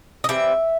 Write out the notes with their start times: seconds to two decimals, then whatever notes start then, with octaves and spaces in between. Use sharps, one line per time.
0.24 D#5
0.29 E3 G3 C4 E5